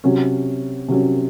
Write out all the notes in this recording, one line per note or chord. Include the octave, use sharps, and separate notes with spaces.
C3 F#3 C#4
C3 F#3 C#4